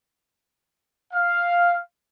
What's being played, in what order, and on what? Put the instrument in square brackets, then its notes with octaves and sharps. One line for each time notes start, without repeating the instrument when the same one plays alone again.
[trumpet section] F5